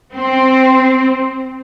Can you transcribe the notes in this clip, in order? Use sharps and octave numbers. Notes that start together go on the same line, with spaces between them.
C4